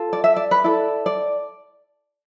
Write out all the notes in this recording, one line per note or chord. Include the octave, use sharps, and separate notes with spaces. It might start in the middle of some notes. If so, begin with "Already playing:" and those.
Already playing: F4 A4
D5
E5
D5
B4
E4 A4 D5
D5